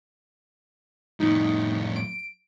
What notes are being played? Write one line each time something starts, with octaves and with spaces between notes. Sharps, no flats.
F2 A2 D#4
D7